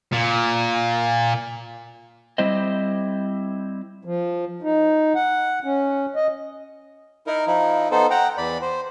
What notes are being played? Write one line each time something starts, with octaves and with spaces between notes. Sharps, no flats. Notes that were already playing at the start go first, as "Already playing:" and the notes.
A#2
G3 C4 E4 C5 D#5
F3
D#4
F#5
C#4
D#5
D#4 E4 A#4
F3 D#4 E4
B3 D#4 A4 C5
F#5 G5 A#5
E2 D5 B5
C5